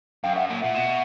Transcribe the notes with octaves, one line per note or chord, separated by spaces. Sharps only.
F#2 F5 G5
E5 F#5
A#2
A#2 E5 F#5
B2